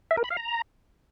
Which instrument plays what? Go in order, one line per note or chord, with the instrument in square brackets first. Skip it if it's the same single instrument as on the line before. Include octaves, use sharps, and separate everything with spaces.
[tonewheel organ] E5
A#4
B5
F5
A#5